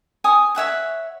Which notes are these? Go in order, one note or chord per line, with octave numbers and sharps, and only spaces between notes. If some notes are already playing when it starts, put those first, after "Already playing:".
C#5 G#5 D#6
C#5 E5 F#5 C#6